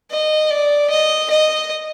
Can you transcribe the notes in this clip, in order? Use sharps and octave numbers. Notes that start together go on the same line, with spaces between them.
D#5
D5
D#5
D#5